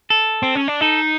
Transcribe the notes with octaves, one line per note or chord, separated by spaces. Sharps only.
A4
C4
C#4
D4
D#4 A4